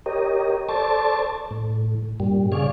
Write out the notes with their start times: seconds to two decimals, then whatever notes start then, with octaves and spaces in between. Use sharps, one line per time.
0.06 G4 A#4 C#5 D#5
0.69 A4 C5 D5 A5 C#6
1.51 A2
2.20 G2 A#2 G3
2.52 C#3 G#4 D5 F5 C#6